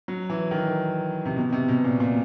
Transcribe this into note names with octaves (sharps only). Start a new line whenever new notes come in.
F#3
E3
D#3
C3
B2
C3
B2
A#2
A#2